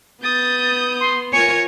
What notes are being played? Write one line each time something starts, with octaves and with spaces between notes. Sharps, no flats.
B3 D#6 G6 A6
C6
F4 A#4 C#5 G#5 C#7